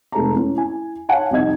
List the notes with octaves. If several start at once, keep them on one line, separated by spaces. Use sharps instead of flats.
F1 G#3 A4 A5 A#5
C#4 E4
E4 G#5
C#5 F5 F#5 G#5 A5
C2 F2 C4 D#4 D#5 G#6